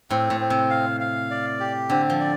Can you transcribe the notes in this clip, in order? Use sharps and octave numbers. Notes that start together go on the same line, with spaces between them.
A2 C4
A2
C4
C3
F5
F5
D5
G4
D3 C4
F3
D5